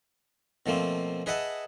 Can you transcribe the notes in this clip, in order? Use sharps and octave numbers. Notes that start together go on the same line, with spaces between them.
B2 F3 A3 A#3 C4
G#4 B4 D#5 E5 F#5 A5